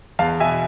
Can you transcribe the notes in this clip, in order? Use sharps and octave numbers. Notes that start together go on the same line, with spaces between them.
E2 F5 A5
B2 E5 G#5